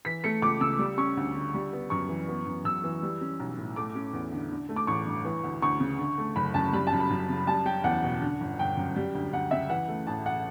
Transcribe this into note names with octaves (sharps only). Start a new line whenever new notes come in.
E3 B6
A3 C#7
C#2 D6
C#3 E6
G3
C#4 C#6
D2
D3
G3
B3
F#2 C#6
E3
B3
F#2
F#2 E6
E3
G3
C#4
B1
A2
A3 D6
C#4
E2
D3
D3
A3
D6
A1 C#6
G2
E3
D2
D2 C#6
C#3
D3
A3
F#1 B5
F#2 A5
G3 B5
A5
F#2
B5
F#2
C#3
G3 A5
C#4 G5
E2 F#5
B2
D3
G1
G1 G5
F#2
G3
D2
D2 F#5
C#3 E5
E3 F#5
A3
A1 A5
F#5